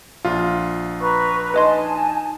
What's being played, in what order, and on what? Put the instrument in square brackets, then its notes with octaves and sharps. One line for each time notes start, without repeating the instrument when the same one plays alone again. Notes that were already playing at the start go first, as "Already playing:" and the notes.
[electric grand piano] A#1 F4
[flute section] B4 A#5 [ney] C#6
[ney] D#4 [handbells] B4 D#5 C6 [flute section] G#5 A5